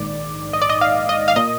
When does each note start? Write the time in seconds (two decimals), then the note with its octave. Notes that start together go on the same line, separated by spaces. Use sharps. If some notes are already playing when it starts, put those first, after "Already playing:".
Already playing: A#1 G#2 D#3 D5
0.53 D#5
0.62 D5
0.70 D#5
0.81 F5
1.09 D#5
1.28 F5
1.36 A#2 D#5